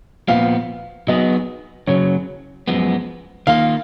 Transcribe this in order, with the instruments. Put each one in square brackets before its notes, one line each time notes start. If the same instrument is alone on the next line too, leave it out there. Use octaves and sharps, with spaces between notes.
[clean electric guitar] A#2 F3 B3 [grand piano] F5
[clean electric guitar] F#3 B3 D#4 G#4 [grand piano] D#5
[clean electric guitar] F#2 C#3 F#3 [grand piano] C#5
[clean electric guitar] F#2 F3 G#3 B3
[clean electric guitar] D#3 A#3 F4 [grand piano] F5